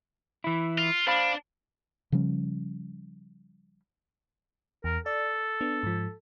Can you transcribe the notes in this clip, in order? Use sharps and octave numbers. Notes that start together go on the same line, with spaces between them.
E3 E4
F4
D4 C5 F5 B5
C#3 F3 G3 C#4
E2 A#4
A4 D5
B3 D4
G#2 F3